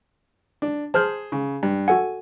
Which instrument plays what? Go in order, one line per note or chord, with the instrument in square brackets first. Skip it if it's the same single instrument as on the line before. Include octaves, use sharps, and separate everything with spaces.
[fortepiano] D4
[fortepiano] G#4 C5 [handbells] A5 F6 G6
[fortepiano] C#3
G2
[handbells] F#4 A4 F#5 [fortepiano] G#5